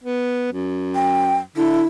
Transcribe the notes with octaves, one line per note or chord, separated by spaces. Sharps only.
B3
F#2
G5
D3 E4